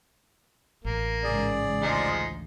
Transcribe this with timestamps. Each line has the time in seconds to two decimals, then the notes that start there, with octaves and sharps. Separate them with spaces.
0.85 A1 A#3
1.24 G#2 C#3 G#4 D5
1.82 D2 F3 G#3 D#4